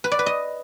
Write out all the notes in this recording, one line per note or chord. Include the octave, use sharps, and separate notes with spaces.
B4
D5
B4
D#5